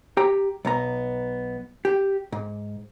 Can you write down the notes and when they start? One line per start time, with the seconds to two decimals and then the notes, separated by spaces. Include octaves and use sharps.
0.17 G4 G5 A#5
0.65 B1 B3 A#5
1.85 G4
2.32 G#2